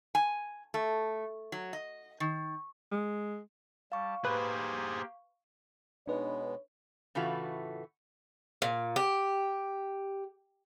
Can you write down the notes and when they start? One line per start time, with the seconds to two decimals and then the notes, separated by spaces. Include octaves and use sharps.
0.15 G#5
0.74 A3
1.52 F#3
1.73 D#5
2.20 D#3
2.92 G#3
3.92 G3 F5 A5 C#6
4.25 A#3 G4 G#4 B4 C5
6.07 B2 G#3 B3 D4 D#4 B4 C#5
7.15 A2 C#3 E3 A3 F4 F#4
8.62 A#2
8.96 G4